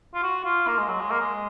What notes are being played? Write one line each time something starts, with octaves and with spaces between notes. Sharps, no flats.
F4
F#4
F4
A#3
G#3
F#3
G#3
A#3
G#3